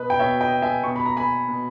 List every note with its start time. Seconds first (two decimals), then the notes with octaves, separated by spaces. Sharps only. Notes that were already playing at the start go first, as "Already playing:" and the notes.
Already playing: B2 B4 D#5
0.10 G5
0.19 B2 C#5 E5
0.41 D#5 G5
0.62 E5 G#5
0.84 B2 C#6
0.96 B5
1.06 A#5
1.17 G#5 B5
1.48 B2